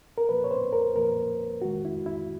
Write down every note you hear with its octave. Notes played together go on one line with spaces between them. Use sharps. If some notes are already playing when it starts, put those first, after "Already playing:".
A#4
A#2 F3 A#3 B4
C#5
C5
A#4
A#2 F3 A#3 A#4
D#2 D#3 G#3 F#4
E4
E4